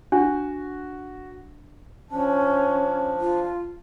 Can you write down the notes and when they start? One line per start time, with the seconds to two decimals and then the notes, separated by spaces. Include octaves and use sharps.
0.12 D4 F#4
2.11 F3 C#4 D4
3.20 F4